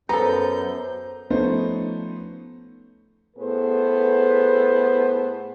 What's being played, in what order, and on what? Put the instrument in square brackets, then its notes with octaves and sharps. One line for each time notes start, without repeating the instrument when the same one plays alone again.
[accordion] F#2 G6 [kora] B3 A4 [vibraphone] C5 [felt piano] A#5
[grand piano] F3 A3 B3 C#4 D#4 C5
[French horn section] A2 B3 G#4 A4 B4 C5